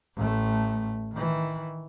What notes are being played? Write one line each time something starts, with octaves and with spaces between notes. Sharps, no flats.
A1 A3
D#3 E3